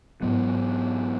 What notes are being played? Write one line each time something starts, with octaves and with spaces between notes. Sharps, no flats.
G#2 F#3 B3